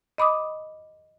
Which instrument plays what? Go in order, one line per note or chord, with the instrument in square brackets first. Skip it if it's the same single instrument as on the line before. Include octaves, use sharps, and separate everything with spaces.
[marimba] D#5 B5 D6 D#6